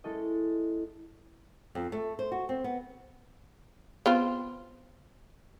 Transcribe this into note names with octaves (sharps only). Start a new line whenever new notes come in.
G#3 C#4 E4 A4 D#5
F2
A3
C5
F#4
C4
B3
B3 C4 F4